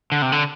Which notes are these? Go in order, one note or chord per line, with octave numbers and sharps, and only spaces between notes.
D3
C3
D3